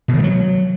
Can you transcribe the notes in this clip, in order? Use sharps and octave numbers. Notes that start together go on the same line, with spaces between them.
B2
D#3
A3
F#3